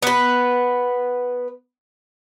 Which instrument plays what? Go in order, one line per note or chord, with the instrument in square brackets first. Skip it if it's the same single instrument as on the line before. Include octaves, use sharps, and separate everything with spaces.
[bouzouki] B3 B4